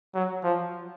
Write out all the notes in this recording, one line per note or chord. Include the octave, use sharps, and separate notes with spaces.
F#3
F3